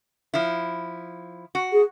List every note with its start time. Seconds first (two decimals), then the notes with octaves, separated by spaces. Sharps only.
0.34 F3 E4
1.55 F#4
1.73 G#4